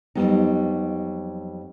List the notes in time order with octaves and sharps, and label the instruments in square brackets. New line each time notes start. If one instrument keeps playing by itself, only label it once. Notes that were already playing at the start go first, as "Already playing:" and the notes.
[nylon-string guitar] F2 C#3 F#3 G3 B3 D#4